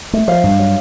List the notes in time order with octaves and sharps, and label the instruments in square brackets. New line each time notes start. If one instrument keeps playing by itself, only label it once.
[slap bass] A3 [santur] E5
[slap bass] F3 [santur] F5
[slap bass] G2
F#3